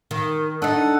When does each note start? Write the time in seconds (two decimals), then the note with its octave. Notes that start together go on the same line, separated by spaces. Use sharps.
0.11 D#3
0.62 D4 D#4 A4 F#5